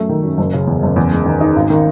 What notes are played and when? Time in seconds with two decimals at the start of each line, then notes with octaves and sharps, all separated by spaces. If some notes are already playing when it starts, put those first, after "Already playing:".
Already playing: F#2 A3
0.09 D#3
0.23 F#2
0.38 F#1
0.53 C#3
0.67 E2
0.83 F#1
0.96 E2
1.11 G#3
1.25 D#3
1.41 D#4
1.56 G#1
1.70 D#3